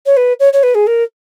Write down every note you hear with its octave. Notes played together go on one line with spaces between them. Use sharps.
C#5
B4
C#5
C#5
B4
G#4
A#4